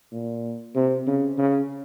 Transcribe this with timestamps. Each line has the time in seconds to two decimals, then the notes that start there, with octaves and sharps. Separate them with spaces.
0.12 A#2
0.75 C3
1.07 C#3
1.38 C#3